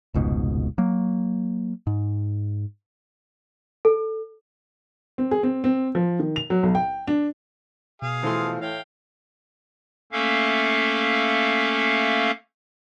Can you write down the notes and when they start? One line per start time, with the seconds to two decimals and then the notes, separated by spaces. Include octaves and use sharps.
0.14 F1 C#2 G#2 B2
0.78 F#3 A#3
1.87 G#2
3.85 A4
5.18 C4
5.31 G#4
5.43 C4
5.64 C4
5.95 F3
6.20 D#3
6.36 F7
6.50 F#3
6.63 B1
6.75 G5
7.07 D4
8.02 B2 G#4 F5
8.23 E3 F3 A3 C6
8.61 A2 F5 G5
10.12 A3 A#3 C#4 A4 E5 F5